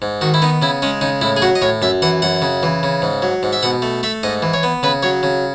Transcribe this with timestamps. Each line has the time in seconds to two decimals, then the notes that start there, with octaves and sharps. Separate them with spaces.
0.02 G#2
0.21 D#3 F#4
0.34 E4
0.42 B3 D#4
0.62 C#3 E4
0.82 G#3 C#4
1.01 C#3 D#4
1.22 A2 E4
1.37 G#4
1.42 F#3 F#4
1.55 D#5
1.62 A2 C#5
1.82 F#2 E5
2.02 E3 F#5
2.22 F#2 F#5
2.42 C#3
2.63 E3
2.83 C#3
3.02 G#2
3.22 F#3
3.43 G#2
3.53 E5
3.63 B2 F#5
3.82 A3
4.03 A3 E5
4.23 G#2 D#5
4.42 E3
4.54 C#5
4.63 B3
4.83 C#3 B4
5.03 F#3 C#5
5.23 C#3